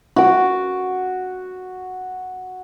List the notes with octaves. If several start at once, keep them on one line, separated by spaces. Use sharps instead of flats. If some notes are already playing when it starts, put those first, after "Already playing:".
F#4 D6